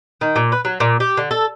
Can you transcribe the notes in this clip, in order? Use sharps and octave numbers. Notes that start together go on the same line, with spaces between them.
D#3
A#2
B4
F#3
A#2
G4
D3
A4